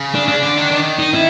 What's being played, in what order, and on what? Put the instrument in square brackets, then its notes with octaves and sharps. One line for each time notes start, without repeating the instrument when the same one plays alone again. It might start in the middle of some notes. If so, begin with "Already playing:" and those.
Already playing: [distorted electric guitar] C#3
[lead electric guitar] D4
D4
[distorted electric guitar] D3
D#3
D#3
[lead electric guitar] D#4
E4